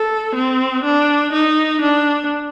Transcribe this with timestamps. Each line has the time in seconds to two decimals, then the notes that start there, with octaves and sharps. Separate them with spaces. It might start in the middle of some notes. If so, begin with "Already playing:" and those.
Already playing: A4
0.36 C4
0.84 D4
1.33 D#4
1.82 D4